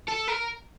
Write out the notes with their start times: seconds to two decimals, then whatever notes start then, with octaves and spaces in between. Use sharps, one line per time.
0.08 A4
0.28 A#4